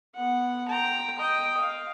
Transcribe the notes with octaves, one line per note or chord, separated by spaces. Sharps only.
B3 F#5
G5 A#5
D#5 G5
F5